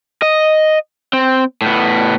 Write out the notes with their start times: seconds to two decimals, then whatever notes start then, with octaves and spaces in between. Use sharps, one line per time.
0.22 D#5
1.13 C4
1.62 A2 B3